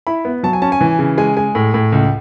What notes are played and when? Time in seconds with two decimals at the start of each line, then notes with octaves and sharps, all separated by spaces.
0.07 E4 B5
0.25 B3
0.43 F#3 A5
0.53 G#5
0.62 C#4 A5
0.72 G#5
0.81 E3
0.99 C#3
1.18 G#3 G#5
1.37 G#3 G#5
1.55 A2
1.74 A2
1.92 C#2